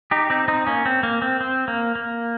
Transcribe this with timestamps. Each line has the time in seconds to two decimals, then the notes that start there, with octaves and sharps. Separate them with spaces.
0.11 D#4 G4
0.30 C4 D#4
0.48 C4 D#4
0.67 A#3 C#4
0.86 C4
1.03 A#3
1.22 C4
1.41 C4
1.68 A#3
1.96 A#3